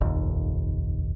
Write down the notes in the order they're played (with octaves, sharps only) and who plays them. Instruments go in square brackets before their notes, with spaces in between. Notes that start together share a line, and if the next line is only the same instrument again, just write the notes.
[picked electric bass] F1 A#1 D#2